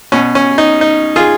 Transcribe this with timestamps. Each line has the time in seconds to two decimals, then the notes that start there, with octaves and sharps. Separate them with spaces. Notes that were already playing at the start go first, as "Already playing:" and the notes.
0.12 B2 C#4
0.35 C#4
0.58 D#4
0.81 D#4
1.16 F4 G#4